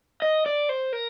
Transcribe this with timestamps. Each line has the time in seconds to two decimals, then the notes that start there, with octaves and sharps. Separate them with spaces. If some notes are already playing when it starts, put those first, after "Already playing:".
0.22 D#5
0.46 D5
0.69 C5
0.93 A#4